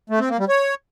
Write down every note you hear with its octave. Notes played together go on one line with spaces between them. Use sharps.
A3
C4
A#3
G3
C#5